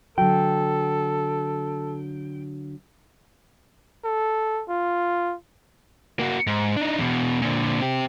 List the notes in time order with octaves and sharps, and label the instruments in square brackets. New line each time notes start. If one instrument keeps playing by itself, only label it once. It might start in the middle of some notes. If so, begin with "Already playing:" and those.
[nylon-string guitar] D3 F#3 [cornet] A4 [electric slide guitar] G5
[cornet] A4
F4
[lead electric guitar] A#3 F#4
G#2
D4 D#4
E2 B2
A#2 D3
C4 G4